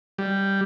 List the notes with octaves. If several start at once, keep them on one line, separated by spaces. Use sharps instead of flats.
G3